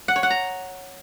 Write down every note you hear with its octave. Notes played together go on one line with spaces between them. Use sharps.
F#5
C#5
F#5
A#5